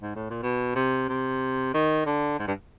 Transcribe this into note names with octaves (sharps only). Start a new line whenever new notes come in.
G#2
A2
A#2
B2
C3
C3
D#3
D3
G#2
G2